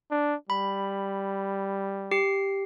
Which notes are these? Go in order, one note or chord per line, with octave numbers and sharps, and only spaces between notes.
D4
G3 B5
G4 C7